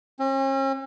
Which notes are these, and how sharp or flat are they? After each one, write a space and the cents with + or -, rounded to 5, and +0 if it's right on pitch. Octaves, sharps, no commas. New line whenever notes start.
C#4 -45